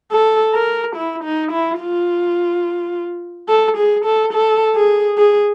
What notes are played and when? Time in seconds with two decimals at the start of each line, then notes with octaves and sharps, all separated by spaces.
0.12 A4
0.55 A#4
0.96 E4
1.24 D#4
1.52 E4
1.80 F4
3.49 A4
3.77 G#4
4.05 A4
4.33 A4
4.75 G#4
5.18 G#4